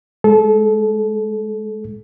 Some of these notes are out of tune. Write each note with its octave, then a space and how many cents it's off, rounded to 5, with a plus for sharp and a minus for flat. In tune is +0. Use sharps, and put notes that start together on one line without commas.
G#3 +0 A4 -30